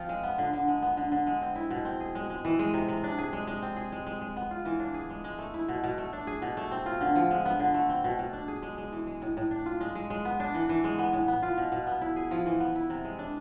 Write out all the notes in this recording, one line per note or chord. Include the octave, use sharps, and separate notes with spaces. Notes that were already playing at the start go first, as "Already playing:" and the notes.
Already playing: F3 C4 F4
G#3
B3
D3
D3
G#3
B3
D3
D3
G#3
C4
E4
B2
C4
G#4
G#3
G#3
E3
G#3
C3
C3
D4
G#4
G#3
G#3
C4
G#4
G#3
G#3
G#3
B3
F4
E3
D4
G#4
G#3
G#3
A3
E4
B2
B2
A3
D4
G#4
B2
A3
C4
F4
D3
F3
G#3
B3
D3
A3
C4
B2
B2
D4
G#4
G#3
G#3
E3
G#3
A2
A2
D4
F4
G#3
G#3
G#3
B3
D4
E3
E3
G#3
B3
A2
B3
F4
B2
B2
B3
E4
G#4
F3
E3
B3
E4
C3
G#3
D4